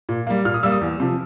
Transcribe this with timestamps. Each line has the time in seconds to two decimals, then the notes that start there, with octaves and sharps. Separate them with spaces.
0.09 A#2
0.27 G3 A#3
0.45 A#2 F6
0.54 D#6
0.63 G3 A#3 E6
0.72 D#6
0.81 E2
1.00 C3 F3